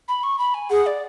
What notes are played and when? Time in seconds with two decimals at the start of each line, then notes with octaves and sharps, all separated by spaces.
0.08 B5
0.23 C#6
0.39 B5
0.54 G#5
0.70 G#4 F#5
0.86 D5